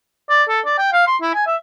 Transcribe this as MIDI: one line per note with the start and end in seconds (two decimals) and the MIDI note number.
0.30 0.43 74
0.49 0.60 69
0.65 0.76 74
0.78 0.92 79
0.93 1.07 77
1.07 1.16 84
1.21 1.34 64
1.34 1.44 80
1.47 1.56 76